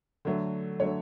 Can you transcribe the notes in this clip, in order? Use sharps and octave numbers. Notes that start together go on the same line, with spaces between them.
D3 F#3 A3
D3 F#3 A3 C#5